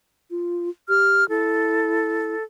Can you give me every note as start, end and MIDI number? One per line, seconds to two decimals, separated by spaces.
0.31 0.69 65
0.89 1.28 67
0.89 1.27 89
1.29 2.35 64
1.29 2.44 69